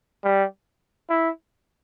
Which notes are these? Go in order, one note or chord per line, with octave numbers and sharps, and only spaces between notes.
G3
E4